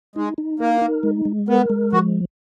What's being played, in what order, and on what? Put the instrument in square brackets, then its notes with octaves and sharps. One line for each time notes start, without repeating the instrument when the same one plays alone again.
[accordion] G#3 [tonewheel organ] D#4
[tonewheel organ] D#4
[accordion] A#3 [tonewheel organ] A#4
[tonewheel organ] D#4
G#3
G#3
[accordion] B3 [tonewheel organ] A#4
[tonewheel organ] G#3
[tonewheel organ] F3 [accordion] F#4